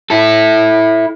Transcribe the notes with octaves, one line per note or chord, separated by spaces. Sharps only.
E4 A4